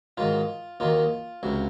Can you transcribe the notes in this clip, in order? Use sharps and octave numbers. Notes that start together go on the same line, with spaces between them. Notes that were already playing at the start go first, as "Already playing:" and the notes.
G#2 D#3 F#3 F4
D#2 D#3 F#3 F4
C#2 C3 F#3